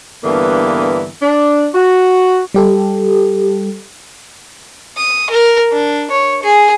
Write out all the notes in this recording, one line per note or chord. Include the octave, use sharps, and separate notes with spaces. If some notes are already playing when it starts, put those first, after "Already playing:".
G2 D3 E3 A#3 B3
D4
F#4
G3 G4 A4
D#6
A#4
D4
C#5
G#4